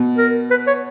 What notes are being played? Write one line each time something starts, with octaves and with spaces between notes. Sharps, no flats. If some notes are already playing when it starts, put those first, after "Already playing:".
Already playing: B2
A#4
B4
C#5